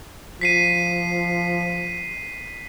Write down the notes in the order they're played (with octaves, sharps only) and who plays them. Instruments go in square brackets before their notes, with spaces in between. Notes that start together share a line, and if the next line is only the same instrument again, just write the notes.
[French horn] F3 [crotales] B6 C7 D#7